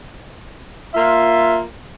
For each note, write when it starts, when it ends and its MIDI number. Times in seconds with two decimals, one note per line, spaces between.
0.94 1.62 58
0.94 1.62 65
0.94 1.60 76